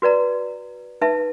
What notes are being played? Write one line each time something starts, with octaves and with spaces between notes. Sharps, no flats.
F#4 B4 D5 A#5
D#4 B4 E5 A5